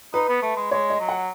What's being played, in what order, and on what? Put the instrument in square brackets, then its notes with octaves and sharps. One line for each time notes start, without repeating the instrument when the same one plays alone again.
[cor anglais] D#4 [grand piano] B4
[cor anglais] B3
A3
G#3
[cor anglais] G#3 [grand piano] C#5
[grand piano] D#5
[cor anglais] F#3
[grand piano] F#5